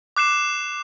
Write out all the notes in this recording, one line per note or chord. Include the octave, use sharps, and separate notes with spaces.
D6 F#6 C7 E7